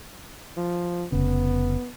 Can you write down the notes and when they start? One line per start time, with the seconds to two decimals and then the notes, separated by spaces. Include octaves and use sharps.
0.57 F3
1.12 F1 C#3 B3